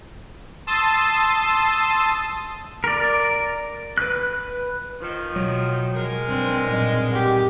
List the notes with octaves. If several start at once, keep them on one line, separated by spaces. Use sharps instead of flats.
A5 C6 D#6 E6 A6
A#4 D5
B4 F#6
D#3 F3
B2 F#3
G#3 A#4
G2 C4
A#2 F#3 C4 D#4
G4